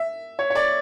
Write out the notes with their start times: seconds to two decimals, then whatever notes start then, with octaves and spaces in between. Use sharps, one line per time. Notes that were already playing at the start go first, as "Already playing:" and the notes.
Already playing: E5
0.39 C#5
0.50 C#5
0.55 D5